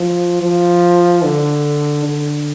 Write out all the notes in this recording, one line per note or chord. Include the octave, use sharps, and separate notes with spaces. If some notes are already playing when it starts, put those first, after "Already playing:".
Already playing: F3
F3
D3
D3